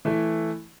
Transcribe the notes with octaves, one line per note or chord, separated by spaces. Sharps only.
E3 A3 E4